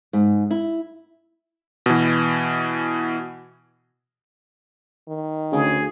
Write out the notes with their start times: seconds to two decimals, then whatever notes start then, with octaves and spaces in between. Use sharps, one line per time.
0.13 G#2
0.51 E4
1.86 B2 E3
5.08 D#3
5.52 D2 C#3 G#4